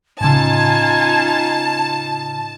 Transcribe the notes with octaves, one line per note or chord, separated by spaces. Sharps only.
A2 C#3 C#4 D#4 F4 G#5 A5